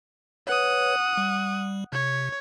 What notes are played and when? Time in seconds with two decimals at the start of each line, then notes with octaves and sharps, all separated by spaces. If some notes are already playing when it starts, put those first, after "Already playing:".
0.47 B4 C#5 F#5 D#6
1.17 G3
1.93 C3 C#5